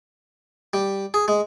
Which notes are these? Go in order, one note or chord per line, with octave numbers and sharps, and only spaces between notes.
G3
G#4
G#3